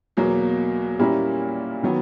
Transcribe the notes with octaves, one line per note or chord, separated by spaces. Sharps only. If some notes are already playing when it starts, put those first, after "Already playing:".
E2 B2 F#3 A#3
A#2 G3 A#3 C#4 E4
D#3 F#3 B3